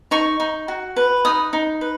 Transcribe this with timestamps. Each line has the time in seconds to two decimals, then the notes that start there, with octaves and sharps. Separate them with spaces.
0.11 D#4 C#6
0.40 D#4
0.68 F#4
0.96 B4
1.25 D#4 D#6
1.53 D#4
1.81 B4